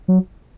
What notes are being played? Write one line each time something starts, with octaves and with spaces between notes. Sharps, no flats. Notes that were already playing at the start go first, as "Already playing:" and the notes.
F#3